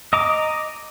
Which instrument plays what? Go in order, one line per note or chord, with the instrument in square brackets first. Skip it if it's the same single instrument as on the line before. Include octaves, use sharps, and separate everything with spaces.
[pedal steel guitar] D#5 A#5 D6